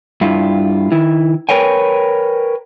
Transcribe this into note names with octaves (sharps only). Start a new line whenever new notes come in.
G2 E4 F4
D#3 E4
A#4 B4 C#5 G5 G#5